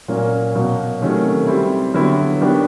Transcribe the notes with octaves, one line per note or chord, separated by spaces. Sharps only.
A#2 F#3 A#3 C#4
B2 F#3 A#3
C3 D#3 F#3 A3 C#4
G3 C4 E4
D3 F#3 B3 E4 G4
D#3 F#3 B3 D4 G4